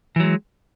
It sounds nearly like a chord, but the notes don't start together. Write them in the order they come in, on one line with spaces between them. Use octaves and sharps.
E3 F#3 G#3